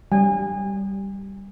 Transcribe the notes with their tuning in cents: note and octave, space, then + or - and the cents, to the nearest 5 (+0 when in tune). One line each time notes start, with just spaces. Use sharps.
G3 +0 G#5 -30